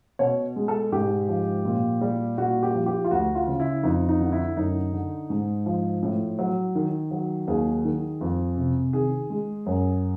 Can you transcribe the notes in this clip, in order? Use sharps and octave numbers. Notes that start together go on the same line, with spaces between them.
B2 C#5
G#3
A4
G#2 G4
F3
A#2
G3
A#2 F#4
G4
F3
G4
F4
D2 F#4
F4
C#3
E4
F2 D#4
D#4
D3
E4
F#2 D#4
D3
G#2
F3
A2
F#3
D#3
F#3
D#2 G#4
D#3
F2
C3
D#3 G#4
G#3
F#2